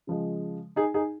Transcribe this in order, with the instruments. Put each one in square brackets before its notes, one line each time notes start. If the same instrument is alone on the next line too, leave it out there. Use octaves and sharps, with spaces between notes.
[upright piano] C#3 F3 G#3
D#4 G#4
D#4 G#4